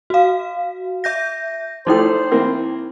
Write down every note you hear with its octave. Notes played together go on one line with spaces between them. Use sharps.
F#4 F5
E5 G6 A#6
F3 A3 D#4 E4 C5 G5
E3 A#3 C4